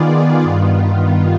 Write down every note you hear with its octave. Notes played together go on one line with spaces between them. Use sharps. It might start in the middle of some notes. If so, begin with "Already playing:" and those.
Already playing: D#3 B3 F4 G#4 D5
G2 D#3 B3 F4